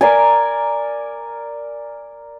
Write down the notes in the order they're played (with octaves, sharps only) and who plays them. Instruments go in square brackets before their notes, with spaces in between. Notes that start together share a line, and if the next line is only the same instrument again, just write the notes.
[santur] A#4 D5 G#5